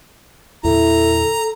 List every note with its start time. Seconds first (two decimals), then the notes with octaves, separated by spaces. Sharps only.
0.64 E2 A#2 D3 E4 A4 A#5